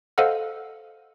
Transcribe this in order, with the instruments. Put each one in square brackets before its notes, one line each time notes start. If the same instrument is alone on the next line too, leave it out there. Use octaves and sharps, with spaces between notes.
[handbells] A4 C5 D#5 F5 F#5 F6